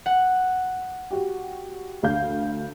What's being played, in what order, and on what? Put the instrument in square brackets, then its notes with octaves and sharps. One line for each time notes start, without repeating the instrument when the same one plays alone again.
[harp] F#5
[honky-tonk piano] F#4 G4
D2 F5 G6